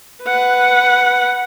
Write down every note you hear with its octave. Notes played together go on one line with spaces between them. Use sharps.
B4 F#5